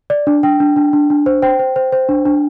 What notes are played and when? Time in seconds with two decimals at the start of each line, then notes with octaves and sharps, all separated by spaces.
0.10 D5
0.27 D4
0.43 D4 G5
0.60 D4
0.76 D4
0.93 D4
1.10 D4
1.26 C5
1.42 C5 G5
1.59 C5
1.76 C5
1.92 C5
2.09 D4
2.26 D4